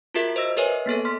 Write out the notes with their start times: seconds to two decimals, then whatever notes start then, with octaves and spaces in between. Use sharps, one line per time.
0.14 F4 F#4 G#4 A#4 E5
0.36 C5 D#5 E6 A#6
0.57 G#4 A#4 B4 C#5 E5 G#5
0.86 A#3 B3 G#4 A4
1.05 C6 F6 B6